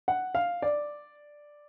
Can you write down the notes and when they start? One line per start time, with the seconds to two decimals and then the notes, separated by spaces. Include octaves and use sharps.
0.08 F#5
0.35 F5
0.62 D5